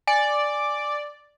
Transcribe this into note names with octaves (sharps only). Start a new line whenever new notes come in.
D5 G#5